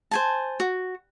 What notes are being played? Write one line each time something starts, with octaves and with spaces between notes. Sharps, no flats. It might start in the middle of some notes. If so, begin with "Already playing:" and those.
C5 G#5 A5
F#4